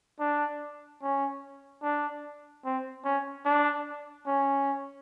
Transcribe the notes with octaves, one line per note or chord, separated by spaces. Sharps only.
D4
C#4
D4
C4
C#4
D4
C#4